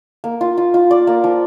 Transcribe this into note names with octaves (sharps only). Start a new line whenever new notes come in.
A#3
F4
F4
F4
D5
A#3
F3